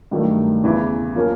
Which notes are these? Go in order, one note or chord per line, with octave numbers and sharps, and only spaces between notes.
G2 D#3 F#3 A3
E2 C#3 E3
F3 A#3 C#4